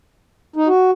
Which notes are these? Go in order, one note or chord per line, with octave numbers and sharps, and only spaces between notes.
D#4
F#4